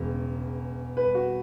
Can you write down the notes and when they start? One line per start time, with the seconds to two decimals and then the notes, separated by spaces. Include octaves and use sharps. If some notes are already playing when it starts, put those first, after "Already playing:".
Already playing: E1 E2 C#3 G#3
0.97 B4
1.15 F#4